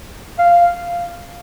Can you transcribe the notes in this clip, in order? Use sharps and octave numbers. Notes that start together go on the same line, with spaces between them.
F5